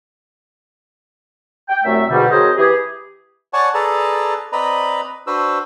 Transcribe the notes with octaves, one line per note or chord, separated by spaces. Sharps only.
G5
C2 F#2 A3 C4 E5
E2 G#2 B2 D3 G3
F#3 C4 G#4 A#4 C5 D#5
E3 G4 G#4
C#5 D5 F#5 G#5 A5 C#6
G#4 A4 B4 D5 A5 A#5
C4 B4 D5 D#5 A#5 B5
D4 F#4 B4 C5 E6